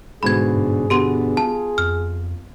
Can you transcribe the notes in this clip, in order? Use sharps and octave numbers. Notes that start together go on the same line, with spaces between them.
G#2 B2 D3 G#4 B5 G#6
G2
B2 D3 B3 G4 C6 D#7
F4 A5
F2 F6